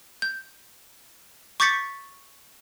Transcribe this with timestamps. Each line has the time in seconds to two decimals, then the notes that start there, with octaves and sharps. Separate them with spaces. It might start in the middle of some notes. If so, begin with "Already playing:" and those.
0.22 G6
1.60 C#6 D6 G6 A6 B6 C#7